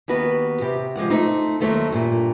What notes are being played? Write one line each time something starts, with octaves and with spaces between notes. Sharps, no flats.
D#2 B3 F#4 B4
C3 G4
F3 G#3 D5 F#5
A3 C4 D#4
D#2 F#3 A3 A4 C5
G2 A#2